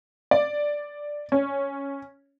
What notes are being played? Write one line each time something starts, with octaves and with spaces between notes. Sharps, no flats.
D5
C#4